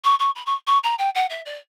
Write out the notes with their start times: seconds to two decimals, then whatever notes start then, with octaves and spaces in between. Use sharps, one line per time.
0.04 C#6
0.19 C#6
0.35 B5
0.46 C#6
0.67 C#6
0.83 A#5
0.98 G5
1.15 F#5
1.30 E5
1.45 D5